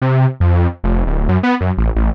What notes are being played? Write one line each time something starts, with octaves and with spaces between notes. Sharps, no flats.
C3
F2
F1
D1
F#2
B3
F#2
A1
A1